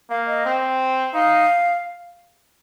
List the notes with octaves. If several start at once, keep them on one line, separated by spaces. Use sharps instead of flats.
A#3 F5
D#5
C4
D#4 F5